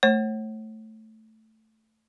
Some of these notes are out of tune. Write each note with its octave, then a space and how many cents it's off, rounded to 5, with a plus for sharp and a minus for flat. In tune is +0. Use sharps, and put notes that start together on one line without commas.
A3 +0 C#5 -40